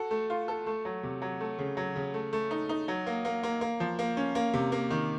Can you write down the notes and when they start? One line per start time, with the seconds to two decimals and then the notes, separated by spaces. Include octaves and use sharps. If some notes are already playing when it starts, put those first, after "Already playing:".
Already playing: F#4 A4
0.11 A3
0.30 F4
0.48 A4
0.67 A3
0.85 F#3
1.03 C3
1.22 F#3
1.41 A3
1.58 C#3
1.77 F#3
1.96 C#3
2.14 A3
2.33 A3
2.51 D#4
2.69 D#4
2.88 F#3
3.06 A#3
3.25 A#3
3.43 A#3
3.61 A#3
3.80 F3
3.99 A#3
4.17 C#4
4.35 A#3
4.54 C3
4.72 A#3
4.91 D#3